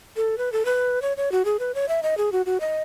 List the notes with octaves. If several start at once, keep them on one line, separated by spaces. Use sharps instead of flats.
A4
B4
A4
B4
C#5
C#5
F#4
G#4
B4
C#5
E5
D#5
G#4
F#4
F#4
D#5